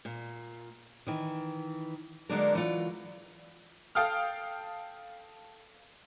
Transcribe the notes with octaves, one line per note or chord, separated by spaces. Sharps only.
A#2
D#3 E3
D3 F#3 G#3 A#3 D4 A#4
E3 F#3 F4
A4 F5 G5 D#6 F6